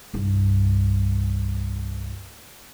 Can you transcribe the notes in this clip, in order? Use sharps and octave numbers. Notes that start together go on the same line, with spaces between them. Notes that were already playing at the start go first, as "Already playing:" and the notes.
C2 G2